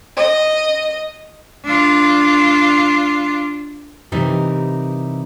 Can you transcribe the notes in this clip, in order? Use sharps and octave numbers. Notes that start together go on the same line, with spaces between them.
D#5
D4 F4
C3 E3 G3 D#4 E4 A#4